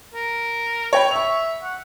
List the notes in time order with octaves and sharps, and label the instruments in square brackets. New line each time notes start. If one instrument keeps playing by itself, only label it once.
[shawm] A#4
[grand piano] C#5 G5 B5
[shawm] E5 [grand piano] C#6 F7
[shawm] F#5